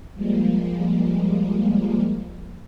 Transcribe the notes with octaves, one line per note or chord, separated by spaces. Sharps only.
F3 G3 G#3 A#3